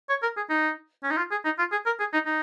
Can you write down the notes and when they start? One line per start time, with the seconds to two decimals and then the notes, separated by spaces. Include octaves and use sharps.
0.09 C#5
0.22 A#4
0.37 G#4
0.50 D#4
1.03 C#4
1.10 D#4
1.17 F4
1.31 G#4
1.45 D#4
1.58 F4
1.72 G#4
1.86 A#4
1.99 G#4
2.13 D#4
2.26 D#4